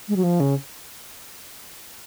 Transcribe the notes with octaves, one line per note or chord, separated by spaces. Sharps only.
G#3
F#3
F3
C#3